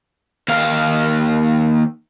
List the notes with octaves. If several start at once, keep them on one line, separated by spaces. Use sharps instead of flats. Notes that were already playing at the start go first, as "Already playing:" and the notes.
D#2 F5